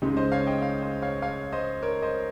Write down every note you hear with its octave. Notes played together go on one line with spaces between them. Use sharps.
C#2 C#3 G#3 D#4 G4
C5 D#5
C#5 F5
D#5 G5
C#5 F5
C5 D#5
C#5 F5
C#5 F5
C5 D#5
A#4 C#5
C5 D#5